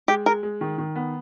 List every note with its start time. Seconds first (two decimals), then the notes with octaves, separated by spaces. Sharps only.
0.08 G#3 G4
0.26 G#3 A#4
0.43 G#3
0.61 D#3
0.78 D#3
0.95 B3